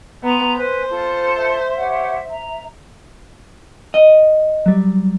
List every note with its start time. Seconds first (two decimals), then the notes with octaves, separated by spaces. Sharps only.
0.24 B3 G#5 A#5 C6
0.57 B4 C5 G#5
0.90 F4 A4 A5
1.37 E5
1.76 G4 C#5 F#5
2.29 A#5
3.94 D#5
4.66 F#3 G3